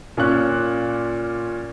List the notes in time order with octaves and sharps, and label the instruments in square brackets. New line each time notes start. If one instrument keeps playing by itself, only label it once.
[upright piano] A#2 C#4 F#6